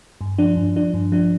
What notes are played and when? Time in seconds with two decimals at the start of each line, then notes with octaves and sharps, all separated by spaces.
0.21 G2
0.39 F3 D4
0.57 G2
0.76 F3 D4
0.94 G2
1.12 F3 D4